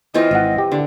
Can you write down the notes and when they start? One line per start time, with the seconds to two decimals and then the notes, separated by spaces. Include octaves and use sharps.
0.14 E3 C4 F4 D#5
0.31 G#1 E3 F#5
0.58 G4
0.72 D3